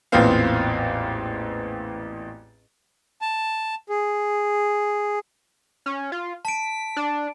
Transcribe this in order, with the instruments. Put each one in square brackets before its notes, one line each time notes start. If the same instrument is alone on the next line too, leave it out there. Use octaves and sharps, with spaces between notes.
[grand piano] A1 E2 A#2 B3 C4 F5
[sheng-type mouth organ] A5
G#4
[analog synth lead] C#4
F4
[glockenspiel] A5 D7 [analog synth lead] B6
[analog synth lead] D4